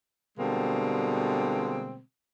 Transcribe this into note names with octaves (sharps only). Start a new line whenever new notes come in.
B2 D3 G3 G#3 A#3 C4